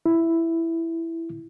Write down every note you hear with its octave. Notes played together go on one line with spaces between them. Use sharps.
E4